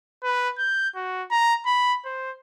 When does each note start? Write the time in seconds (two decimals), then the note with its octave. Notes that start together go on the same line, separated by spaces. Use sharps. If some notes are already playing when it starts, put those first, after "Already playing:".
0.24 B4
0.58 G6
0.96 F#4
1.31 A#5
1.66 B5
2.05 C5